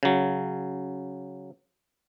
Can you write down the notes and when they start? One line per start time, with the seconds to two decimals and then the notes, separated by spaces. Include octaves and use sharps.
0.03 C#3 F#3